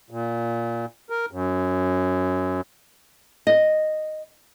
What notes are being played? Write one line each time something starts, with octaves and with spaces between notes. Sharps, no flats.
A#2
A#4
F#2
D#5